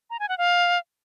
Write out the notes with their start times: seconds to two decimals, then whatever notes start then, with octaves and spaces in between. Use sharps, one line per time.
0.10 A#5
0.19 G#5
0.29 F#5
0.38 F5